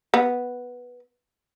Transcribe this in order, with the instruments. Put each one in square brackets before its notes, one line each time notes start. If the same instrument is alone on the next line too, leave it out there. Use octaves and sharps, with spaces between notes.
[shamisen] B3